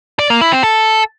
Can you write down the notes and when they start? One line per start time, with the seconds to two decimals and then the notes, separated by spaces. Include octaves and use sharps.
0.19 D5
0.30 A#3
0.41 E4
0.52 C4
0.63 A4